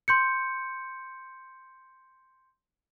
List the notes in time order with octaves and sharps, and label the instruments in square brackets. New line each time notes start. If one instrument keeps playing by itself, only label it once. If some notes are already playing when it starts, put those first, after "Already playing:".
[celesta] C6 G6 C#7